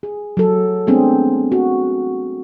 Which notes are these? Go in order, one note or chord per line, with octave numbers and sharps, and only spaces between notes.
G#4
F#3 A4
G#3 A3 B3 C4 D4 G#4
F#4